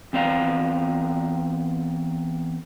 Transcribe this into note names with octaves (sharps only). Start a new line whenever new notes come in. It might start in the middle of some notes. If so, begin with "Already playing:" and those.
E2 C4 D5 F5 A#5